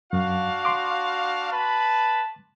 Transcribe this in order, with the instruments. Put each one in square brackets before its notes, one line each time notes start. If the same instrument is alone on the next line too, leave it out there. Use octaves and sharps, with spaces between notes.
[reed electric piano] F#2 [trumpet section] D4 F5 [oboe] F#4
[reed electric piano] C6 D6
[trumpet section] B4 B5 [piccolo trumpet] A5